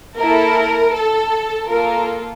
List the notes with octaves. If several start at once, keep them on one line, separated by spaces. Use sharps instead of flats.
A#3 E4 A4 A#4
A4
A#3 F4 A4 A#4